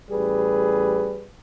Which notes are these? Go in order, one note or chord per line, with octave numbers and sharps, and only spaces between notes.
A1 G3 G#4 B4